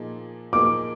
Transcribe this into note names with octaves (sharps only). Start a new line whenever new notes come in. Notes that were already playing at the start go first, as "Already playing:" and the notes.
Already playing: A#2 F3 A#3 D#4 G#4
A#2 F3 A#3 D#4 G#4 D6